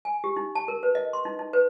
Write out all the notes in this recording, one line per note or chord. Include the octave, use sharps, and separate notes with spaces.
G#5
G4
D#4
A5
A#4
B4
D#5
C6
D#4
D#4
B4